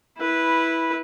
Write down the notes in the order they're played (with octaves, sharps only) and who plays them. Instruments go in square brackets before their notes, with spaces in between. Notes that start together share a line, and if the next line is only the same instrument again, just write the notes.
[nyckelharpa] E4 B4